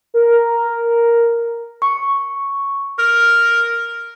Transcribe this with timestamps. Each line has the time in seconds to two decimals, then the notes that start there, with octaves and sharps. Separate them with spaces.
0.14 A#4
1.82 C#6
2.98 A#4